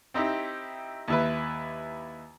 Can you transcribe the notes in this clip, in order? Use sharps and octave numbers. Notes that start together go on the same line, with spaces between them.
C4 D#4 E4 G4
D#2 E4 B4